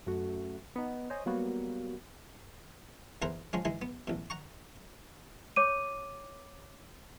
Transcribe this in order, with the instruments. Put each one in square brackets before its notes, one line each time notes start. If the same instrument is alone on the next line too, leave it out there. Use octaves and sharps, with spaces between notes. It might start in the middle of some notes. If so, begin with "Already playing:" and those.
[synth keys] F#2 A3 F#4
B3 D#4
C5 C#5 D#5 G#5
F#3 G3 A#3 B3 F#4
[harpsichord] E2 E3 A#4 C5 F#5
F3 G#3 C#4
E3 G#3 D#4
B3
A1 B2
F#5 A#5 C#6
[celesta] C#5 D6 D#7